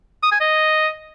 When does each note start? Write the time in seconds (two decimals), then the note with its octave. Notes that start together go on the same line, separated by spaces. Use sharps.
0.23 D#6
0.32 G#5
0.41 D#5